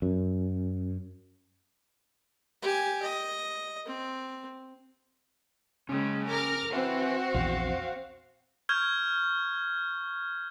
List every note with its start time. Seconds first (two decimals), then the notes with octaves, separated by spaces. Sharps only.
0.02 F#2
2.62 G4 G#5
3.03 D#5
3.86 C4
5.89 C#3 G#3 C#4 G5
6.28 A#4 A#5 D6 F6
6.73 C4 F#4 B4 E5
7.34 A#1 E2 F5
8.69 C#6 F6 G6 G#6